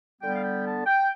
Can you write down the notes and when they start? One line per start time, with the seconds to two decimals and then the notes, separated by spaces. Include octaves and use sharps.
0.21 D3 G3 B3 G5
0.34 F5
0.43 G5
0.65 A5
0.86 G5